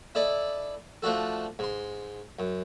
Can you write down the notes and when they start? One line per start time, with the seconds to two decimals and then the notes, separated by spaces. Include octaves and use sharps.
0.15 E4 A4 D5 D#5
1.03 F3 A3 D4 F#4 A4
1.59 G#2 C6
2.39 F#2